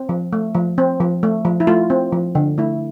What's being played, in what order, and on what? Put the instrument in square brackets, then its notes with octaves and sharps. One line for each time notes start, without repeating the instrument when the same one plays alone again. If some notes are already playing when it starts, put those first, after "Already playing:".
Already playing: [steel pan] C4
F3
A3
F3
C4
F3
A3
F3
E4
A3 F4
C4
F3
D3
A3 E4